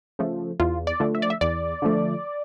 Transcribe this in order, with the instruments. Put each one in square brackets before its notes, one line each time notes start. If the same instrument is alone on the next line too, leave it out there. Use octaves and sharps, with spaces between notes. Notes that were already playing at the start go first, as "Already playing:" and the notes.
[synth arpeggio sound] C#3 F3 A3
E2 F4
D5
D3 F3 A3
E5
D5
E5
E2 D5
D3 F3 A3